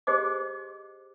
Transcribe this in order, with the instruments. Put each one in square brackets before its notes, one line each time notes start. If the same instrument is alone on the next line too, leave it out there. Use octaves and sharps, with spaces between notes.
[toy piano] G4 G#4 C5 D#5 D6